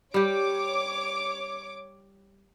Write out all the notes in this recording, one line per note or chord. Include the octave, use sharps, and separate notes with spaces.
G3 G4 C#5 D6